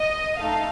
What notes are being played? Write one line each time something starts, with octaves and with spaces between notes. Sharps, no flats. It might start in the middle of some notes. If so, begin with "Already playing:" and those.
Already playing: D#5
A3 D#4 A4 F5